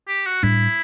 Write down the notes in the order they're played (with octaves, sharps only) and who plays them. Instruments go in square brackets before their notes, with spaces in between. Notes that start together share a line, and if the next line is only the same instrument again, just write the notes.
[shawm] G4
F#4
[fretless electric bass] A2 G3 D4 [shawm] E4